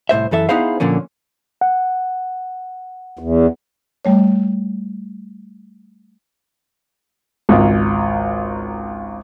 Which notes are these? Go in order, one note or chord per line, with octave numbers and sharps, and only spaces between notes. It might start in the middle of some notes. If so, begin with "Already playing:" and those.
C2 A2 C5 E5
F#2 E3 A4 E5
B3 D#4 E4 G#4 C5 F5
A#2 D3 F3 A#3 C#4
F#5
E2
G3 A3 C#5
G#1 C#2